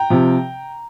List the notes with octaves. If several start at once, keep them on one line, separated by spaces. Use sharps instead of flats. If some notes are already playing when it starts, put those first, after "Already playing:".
Already playing: G5 A#5
C3 F3